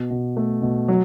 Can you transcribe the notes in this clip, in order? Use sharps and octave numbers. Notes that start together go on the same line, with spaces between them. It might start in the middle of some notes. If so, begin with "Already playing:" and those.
Already playing: B2
B2
A3
B2
F#3